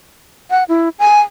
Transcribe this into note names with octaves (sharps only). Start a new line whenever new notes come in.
F#5
E4
G#5